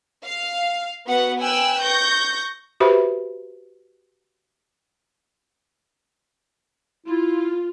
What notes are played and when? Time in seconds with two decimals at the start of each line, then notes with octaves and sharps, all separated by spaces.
0.24 F5
1.07 B3 F#4 F#5
1.41 B4 G5 G#5 E6 F#6
1.80 C#6 G6 A#6
2.80 F#4 G4 B4 C5 E5 B5
7.07 E4 F4